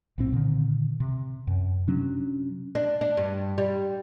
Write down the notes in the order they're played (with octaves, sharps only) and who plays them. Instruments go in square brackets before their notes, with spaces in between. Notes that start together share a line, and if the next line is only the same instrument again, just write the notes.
[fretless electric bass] B1 A2 C4
A#2 D3 D#3
C3
F#2
C3 F#3 C#4 D4
[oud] D4
D4
G2
G3